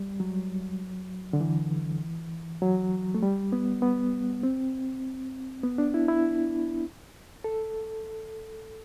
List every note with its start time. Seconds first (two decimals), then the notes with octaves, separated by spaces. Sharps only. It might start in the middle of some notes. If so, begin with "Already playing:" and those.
Already playing: G3
0.20 F#3
1.33 D3
1.41 E3
2.62 F#3
3.14 A3
3.23 G3
3.52 B3
3.82 B3
4.43 C4
5.64 B3
5.78 D4
5.94 E4
6.08 E4
7.44 A4